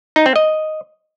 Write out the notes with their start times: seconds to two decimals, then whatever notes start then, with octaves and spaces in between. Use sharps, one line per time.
0.16 D#4
0.26 C4
0.36 D#5